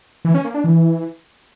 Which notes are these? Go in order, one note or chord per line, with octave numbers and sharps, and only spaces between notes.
E3
C#4
A#3
D4
E3